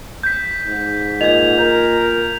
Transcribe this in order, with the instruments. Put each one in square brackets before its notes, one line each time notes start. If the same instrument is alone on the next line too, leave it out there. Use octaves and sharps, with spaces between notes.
[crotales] G6 B6
[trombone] G#2
[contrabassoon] A#2 [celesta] D#5 [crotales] G#6 F7
[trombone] A#4 [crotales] G6